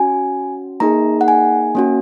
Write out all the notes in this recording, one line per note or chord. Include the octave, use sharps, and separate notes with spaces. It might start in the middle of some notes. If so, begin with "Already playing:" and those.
Already playing: C#4 F#4 G#5
A#3 D#4 G#4 A#5
F#5
G#5
A#3 C#4 F#4